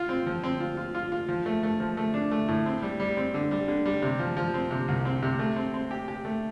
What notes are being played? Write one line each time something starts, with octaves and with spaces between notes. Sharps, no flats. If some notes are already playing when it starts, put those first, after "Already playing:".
Already playing: F4
C4
F3
C4
F4
F4
F4
F4
F3
A3
A3
F3
A3
D4
A3
A2
C4
G3
G3
C4
D3
G3
D3
G3
C3
F3
F3
C4
C3
C2
C4
C3
A3
C4
C4
G4
G4
A3